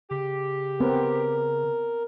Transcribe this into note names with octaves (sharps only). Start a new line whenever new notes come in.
C#3 G4
B3 C4 A#4 B4